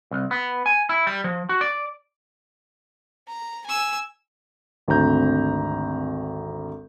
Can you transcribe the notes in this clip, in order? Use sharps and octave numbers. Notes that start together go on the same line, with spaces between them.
C2
B3
G#5
E4
G3
F3
F#4
D5
A#5
G#5 E6
G#1 D2 C4 A#5 G6